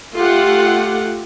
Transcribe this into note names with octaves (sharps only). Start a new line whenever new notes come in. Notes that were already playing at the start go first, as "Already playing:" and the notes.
A3 F4 G4 F#5